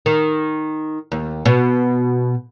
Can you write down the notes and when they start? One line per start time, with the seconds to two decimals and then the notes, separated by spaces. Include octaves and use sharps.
0.06 D#3
1.12 D#2
1.45 B2